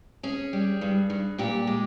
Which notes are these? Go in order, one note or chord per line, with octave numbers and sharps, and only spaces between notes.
C#4 G#4
G3
G2
G2
A#2 G4
G#3